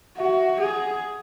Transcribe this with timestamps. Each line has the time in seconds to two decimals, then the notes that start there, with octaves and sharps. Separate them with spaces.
0.18 F#4 E5
0.25 F#5
0.33 E5
0.60 G#4 F#5